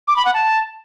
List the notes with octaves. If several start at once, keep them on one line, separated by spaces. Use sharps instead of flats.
D6
B5
F#5
A5